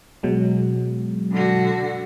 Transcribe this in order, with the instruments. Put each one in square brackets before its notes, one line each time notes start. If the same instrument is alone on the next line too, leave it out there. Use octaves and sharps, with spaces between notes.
[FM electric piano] B2 F#3 G#3
[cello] D3 F#4